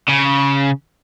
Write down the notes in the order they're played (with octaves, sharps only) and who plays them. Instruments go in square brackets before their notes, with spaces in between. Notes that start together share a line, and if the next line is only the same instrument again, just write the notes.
[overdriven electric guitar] C#3